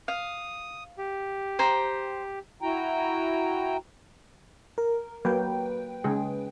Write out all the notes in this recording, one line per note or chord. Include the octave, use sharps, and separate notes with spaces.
F5 D#6
G4
C5 G5 A#5
E4 F#4 G5 A#5
A#4
F#3 A#3 B4 G5
C#3 G#3 G#4